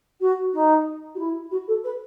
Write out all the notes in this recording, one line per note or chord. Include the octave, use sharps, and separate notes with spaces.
F#4
D#4
F#4
E4
F#4
A4
B4